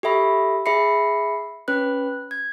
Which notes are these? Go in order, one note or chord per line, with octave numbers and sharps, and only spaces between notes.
G4 A4 E5 B5
G#4 E5 B5 C7 C#7
C#4 B4 F#6
G#6